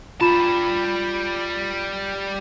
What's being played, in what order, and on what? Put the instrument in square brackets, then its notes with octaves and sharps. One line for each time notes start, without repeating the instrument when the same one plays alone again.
[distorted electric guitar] G3 A5 [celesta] F4 B5 E7